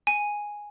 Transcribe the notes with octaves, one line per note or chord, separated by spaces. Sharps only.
G#5